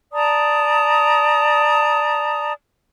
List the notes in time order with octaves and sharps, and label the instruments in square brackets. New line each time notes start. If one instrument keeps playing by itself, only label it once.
[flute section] D5 A5 A#5 D#6